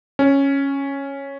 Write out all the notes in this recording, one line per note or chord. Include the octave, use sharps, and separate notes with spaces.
C#4